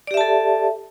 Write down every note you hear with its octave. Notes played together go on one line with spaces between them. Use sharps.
G4 A4 D5 E5 A5